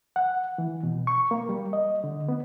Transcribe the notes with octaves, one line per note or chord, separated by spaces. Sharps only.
F#5
E3
B2
C#6
A#3
G3
D#5
D3
B3